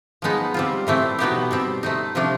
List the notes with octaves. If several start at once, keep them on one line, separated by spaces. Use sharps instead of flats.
F3 G#3 B3 D#4
G3 C4 F4
A2 E3 A3 C4 E4
B2 F#3 B3 D#4 G4
B2 G3 C4
A3 C4 D#4
C3 F3 A3 D4